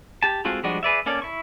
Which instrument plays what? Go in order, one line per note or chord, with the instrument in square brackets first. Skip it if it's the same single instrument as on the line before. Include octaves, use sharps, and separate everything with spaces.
[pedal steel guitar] G4 A5
G#3 C4 F4 F#4 A4
F3 G3 G#3 D4 F#4
G#4 B4 D5 E5
A#3 C#4 A4 D5
E4 C#6